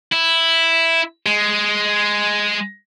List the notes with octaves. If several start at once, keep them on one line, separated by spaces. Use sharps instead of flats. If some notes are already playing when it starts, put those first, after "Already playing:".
E4
G#3